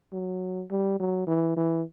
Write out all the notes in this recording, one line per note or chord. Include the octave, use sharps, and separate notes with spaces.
F#3
G3
F#3
E3
E3